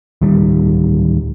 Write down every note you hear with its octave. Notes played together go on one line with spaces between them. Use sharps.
D1 D#3 G3